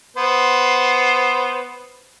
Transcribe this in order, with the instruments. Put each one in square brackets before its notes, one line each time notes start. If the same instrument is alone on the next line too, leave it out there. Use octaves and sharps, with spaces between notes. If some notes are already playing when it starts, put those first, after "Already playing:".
[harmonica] B3 C5